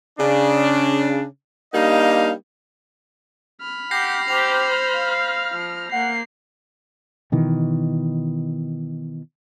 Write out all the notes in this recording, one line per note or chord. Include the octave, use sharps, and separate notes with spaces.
C#3 D4
G3 A#3 D4 D#4 D#5 F5
B5 F6
G4 F#5 G6 A#6 C7
G4 C5 F7
F5
F3
A#3 F#5 C7
B2 D#3 E3